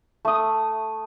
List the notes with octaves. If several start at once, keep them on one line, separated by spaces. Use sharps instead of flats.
A3 D#6